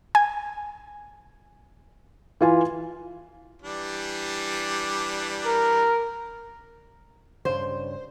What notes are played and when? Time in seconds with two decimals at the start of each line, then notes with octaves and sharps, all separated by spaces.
0.15 G#5
2.41 E3 F4 G#5
3.62 E3 G3 D4
5.45 A#4
7.45 G2 C#3 C5